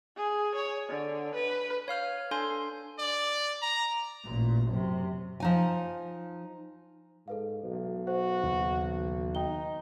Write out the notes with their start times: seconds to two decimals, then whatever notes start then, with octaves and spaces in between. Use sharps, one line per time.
0.17 G#4
0.56 C#5
0.89 D3
1.35 B4
1.88 C#5 F5 F6 G6
2.31 D4 A4 G#5 C6 G6
2.99 D5
3.62 A#5
4.24 A1 A#2
4.69 F#2 C3
5.40 F3 D#4 G#5
7.28 G#2 A4 B4 F5
7.63 B1
8.07 F#4 C5
8.43 D#2 C#3
9.35 D#4 G5 G7